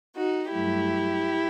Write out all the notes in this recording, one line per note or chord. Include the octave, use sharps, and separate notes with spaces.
D#4 F#4
G2 F#3 A3 E4 G4